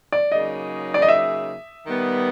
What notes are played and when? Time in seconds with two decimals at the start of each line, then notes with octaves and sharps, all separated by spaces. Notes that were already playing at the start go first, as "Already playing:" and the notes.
0.12 D5
0.32 C#3 F#3 A#3 D#4 G#4 D#5
0.94 D5
1.02 D#5
1.08 E5
1.86 D#3 G3 B3